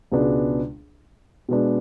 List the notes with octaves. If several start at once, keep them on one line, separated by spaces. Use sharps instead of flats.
C#2 B2 G#3 B3 D4
B2 G#3 B3 D4